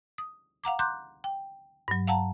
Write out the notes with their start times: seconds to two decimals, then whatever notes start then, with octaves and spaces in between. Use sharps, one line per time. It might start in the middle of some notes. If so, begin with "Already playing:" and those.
0.18 D#6
0.64 F5 F#5 A#5 D6
0.79 A#5 C6 D6 F#6 G6
1.24 G5
1.88 G2 F#3
2.07 F5 F#5 A5 A#5